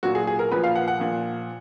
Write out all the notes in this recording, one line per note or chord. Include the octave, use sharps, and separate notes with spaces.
A#2 F#3 F#4
G#4
G#4
A#4
A#2 F3 B4
F5
F#5
F#5
A#2 F3